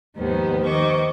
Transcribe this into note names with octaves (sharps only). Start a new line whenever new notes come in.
D#2 G#2 D#3 F3 B3 C5
D#3 C5 D#5 C#6 D6